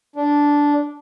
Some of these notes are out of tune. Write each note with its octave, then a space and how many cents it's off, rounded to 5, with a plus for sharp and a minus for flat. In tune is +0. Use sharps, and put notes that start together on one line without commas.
D4 -10